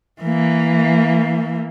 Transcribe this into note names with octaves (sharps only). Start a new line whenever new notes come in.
E3 A#3